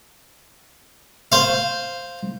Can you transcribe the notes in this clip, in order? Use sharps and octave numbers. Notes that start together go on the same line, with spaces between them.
C5 F5